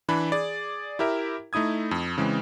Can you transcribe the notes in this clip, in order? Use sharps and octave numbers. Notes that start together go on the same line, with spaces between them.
E3 D4 B5
G#4 D5
E4 G4 A#4 E5
A3 D#4 E4 D#6 G#6
F2
C#3 E3 G#3 C4